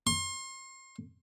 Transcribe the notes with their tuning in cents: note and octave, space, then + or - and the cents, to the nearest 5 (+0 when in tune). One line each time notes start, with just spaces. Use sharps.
C6 +35